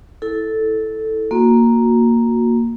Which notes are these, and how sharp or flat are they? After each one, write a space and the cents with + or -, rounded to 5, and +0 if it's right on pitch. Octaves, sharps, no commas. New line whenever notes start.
E4 -15 A4 +0
A#3 +0 F#4 -25